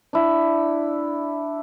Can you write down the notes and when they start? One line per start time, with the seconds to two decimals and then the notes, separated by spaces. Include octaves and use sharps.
0.13 D4 E4